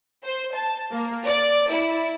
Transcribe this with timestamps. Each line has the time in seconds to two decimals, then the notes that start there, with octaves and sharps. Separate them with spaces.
0.24 C5
0.54 A5
0.92 A#3
1.26 D5
1.70 E4